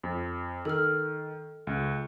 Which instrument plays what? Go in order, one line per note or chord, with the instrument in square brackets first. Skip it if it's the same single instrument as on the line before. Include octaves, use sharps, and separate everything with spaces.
[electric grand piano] F2
[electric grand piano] D#3 [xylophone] A4 F6
[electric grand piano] C#2